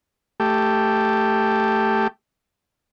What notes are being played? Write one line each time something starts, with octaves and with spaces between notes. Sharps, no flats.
A3 G4